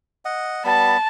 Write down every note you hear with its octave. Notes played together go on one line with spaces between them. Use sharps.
D#5 F#5
G3 B3 A5 B5